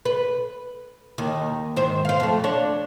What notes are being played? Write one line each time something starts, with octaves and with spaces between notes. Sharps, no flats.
B4
D#2 D#3
G#2 D#3 C5
C5 F5
F2 A3
D4 C#5